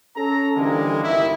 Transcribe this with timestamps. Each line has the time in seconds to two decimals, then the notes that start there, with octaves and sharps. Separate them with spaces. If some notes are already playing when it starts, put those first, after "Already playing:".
0.16 C#4 A4 A#5
0.56 D3 E3 F3 G3 G#3 A#3
1.03 G1 C2 D#3 E4